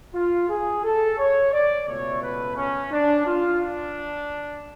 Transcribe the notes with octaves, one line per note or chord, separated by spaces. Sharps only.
F4
G#4
A4
C#5
D5
C#2 B2 A3 C#5
B4
C#4
D4
F4
D4